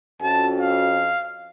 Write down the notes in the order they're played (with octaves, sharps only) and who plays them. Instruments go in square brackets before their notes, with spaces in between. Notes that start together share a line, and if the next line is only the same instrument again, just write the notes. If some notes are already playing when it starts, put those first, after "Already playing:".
[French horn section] F2 C#4 F#4 [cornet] A5
[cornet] F5